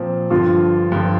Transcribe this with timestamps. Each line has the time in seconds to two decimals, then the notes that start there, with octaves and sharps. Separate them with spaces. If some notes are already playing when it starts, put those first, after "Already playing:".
Already playing: A#2 F3 C4
0.30 G2 D3 F3 F4
0.92 G2 D3 F3